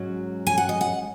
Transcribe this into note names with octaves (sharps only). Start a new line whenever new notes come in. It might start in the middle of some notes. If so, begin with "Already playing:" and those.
Already playing: G#2 F#3 C#4
G#5
F#5
D#5
F#5